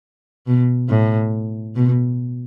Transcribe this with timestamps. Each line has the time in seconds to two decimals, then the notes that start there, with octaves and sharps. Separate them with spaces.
0.47 B2
0.89 A2
1.76 B2